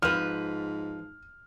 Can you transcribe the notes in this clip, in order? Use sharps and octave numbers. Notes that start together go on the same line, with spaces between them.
G#2 F3 B4 F6